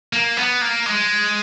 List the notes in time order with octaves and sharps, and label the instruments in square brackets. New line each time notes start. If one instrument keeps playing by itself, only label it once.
[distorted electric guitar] A#3
B3
A#3
G#3